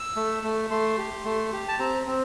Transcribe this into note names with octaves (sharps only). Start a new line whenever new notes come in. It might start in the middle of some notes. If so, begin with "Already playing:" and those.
Already playing: E6
A3
A3
A3 C6
G4
A3
G4
A5
C4 A#5
C4